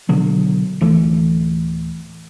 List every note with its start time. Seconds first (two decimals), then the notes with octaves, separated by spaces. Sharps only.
0.09 B2 D3 F#3
0.81 D1 E3 A3